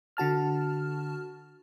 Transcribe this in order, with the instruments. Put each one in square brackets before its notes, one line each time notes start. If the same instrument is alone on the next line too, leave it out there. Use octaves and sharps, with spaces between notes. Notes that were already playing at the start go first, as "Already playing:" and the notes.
[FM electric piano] D3 F#4 A5 F6